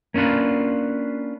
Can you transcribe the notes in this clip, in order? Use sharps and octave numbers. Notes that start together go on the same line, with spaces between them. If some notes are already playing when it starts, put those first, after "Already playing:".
A#3 C#4 D4 F4 B4